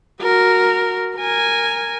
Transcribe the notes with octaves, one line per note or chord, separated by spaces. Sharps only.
F#4 A#4
A#4 G#5